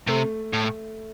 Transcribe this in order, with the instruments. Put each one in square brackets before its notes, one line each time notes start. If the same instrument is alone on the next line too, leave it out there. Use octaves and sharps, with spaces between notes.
[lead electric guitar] C3 [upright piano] A3
[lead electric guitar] A2